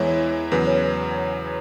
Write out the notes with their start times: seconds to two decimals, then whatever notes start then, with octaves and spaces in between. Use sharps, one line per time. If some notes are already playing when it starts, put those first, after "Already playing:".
Already playing: E2 E3 G#3 E4 C#5
0.52 E2 C#3 F#3 B4
0.67 C#5